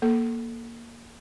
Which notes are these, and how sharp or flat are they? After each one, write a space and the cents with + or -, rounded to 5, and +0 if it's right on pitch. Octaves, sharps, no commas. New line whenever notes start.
A#3 +5 A4 +0